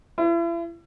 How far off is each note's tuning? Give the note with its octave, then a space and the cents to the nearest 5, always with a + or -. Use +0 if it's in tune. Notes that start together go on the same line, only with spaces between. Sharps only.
E4 +40